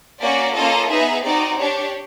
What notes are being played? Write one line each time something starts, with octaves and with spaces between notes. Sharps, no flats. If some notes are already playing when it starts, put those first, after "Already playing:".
A#3 C#4 F#4 D5
A#3 C#4 F4 A4 D#5
B3 D#4 G#4 E5
C4 D#4 F#4 D5
D4 G4 C#5